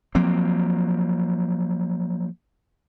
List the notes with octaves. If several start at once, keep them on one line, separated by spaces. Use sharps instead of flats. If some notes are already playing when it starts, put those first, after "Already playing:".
F3 F#3 A#3 C4